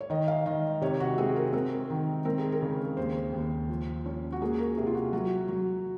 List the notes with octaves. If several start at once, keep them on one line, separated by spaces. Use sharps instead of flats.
C#5
D#3 D#5
F5
D#3 D#5
C3 C#5
F#4
C4 G#4
A#4
C4 A#4
D#3
C4 A#4
G#4
A#4
C#3
D#2 C5
D#2
F3
C#4
F#4
A#3 G#4
A#4
C3 G#4
F4
F#4
F#3 F#4
F#3